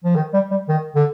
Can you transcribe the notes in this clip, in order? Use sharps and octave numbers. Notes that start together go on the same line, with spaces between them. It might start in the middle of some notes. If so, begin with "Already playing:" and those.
F3
D#3
G3
G3
D#3
D3